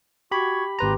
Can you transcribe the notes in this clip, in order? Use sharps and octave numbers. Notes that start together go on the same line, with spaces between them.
F#4 G4 B5 C#6 G#6
G#1 G4 B4 A#5 C6